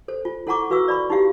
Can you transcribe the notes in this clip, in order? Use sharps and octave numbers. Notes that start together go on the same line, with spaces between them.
A4 C5
F4
E4 A4 F#5 A#5 C#6 D6
F#4 B4 F5 C#6 E6
D5 B5 C#6
D#4 E4 G4 F5